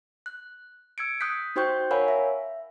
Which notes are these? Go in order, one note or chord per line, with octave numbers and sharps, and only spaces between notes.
F#6
E6 G#6 C#7 D7
D#6 F#6 G6 B6
D#4 F#4 C5 G5 C#6 G6
A#4 C#5 F5 F#5 G#5 B5
E5